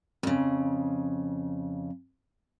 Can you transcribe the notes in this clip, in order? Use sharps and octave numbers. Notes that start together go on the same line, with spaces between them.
F2 C#3